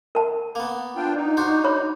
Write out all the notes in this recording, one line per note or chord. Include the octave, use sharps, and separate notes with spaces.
A#4 A5
A#3 B3
D4 F4 G5
D#4
D4 F#4 C5
C#5 B5 D6